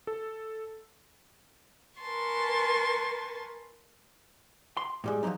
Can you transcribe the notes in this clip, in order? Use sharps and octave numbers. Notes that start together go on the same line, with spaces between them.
A4
A#4 B4 G#5 A5 C6 C#6
C6
A2 G3 G#3
F3 F#3 G#3 A#3 D#4